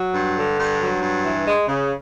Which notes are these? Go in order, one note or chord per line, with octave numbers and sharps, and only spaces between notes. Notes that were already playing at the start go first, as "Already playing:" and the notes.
Already playing: F#3
G2
D3
G2
F#3
G2
E3
G#3
C#3